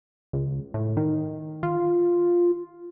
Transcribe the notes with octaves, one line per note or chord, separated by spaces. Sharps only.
C#2
A2
D#3
F4